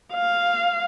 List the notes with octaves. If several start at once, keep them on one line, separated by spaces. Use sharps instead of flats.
F5